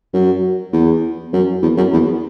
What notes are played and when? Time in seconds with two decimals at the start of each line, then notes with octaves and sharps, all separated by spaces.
0.14 F#2
0.73 E2
1.33 F#2
1.62 E2
1.77 F#2
1.93 E2